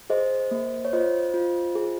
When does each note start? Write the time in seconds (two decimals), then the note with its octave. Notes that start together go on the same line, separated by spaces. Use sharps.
0.10 G#4 C5 D#5
0.51 A#3
0.85 C#5
0.93 F4 C5 D#5
1.34 F4
1.75 G#4